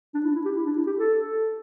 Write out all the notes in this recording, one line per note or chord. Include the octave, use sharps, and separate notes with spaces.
D4
E4
D4
E4
G4
E4
D4
E4
G4
A4